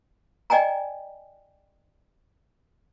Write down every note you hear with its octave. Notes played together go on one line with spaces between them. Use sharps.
D5 D#5 G5 G#5 A#5